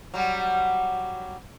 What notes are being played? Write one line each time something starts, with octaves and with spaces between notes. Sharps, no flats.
F#3 G3